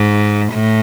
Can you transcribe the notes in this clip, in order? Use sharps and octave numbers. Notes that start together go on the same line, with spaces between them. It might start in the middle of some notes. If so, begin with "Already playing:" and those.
Already playing: G#2
A2